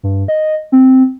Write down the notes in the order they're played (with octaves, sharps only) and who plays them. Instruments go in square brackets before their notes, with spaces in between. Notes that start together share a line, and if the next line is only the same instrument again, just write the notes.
[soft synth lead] G2
D#5
C4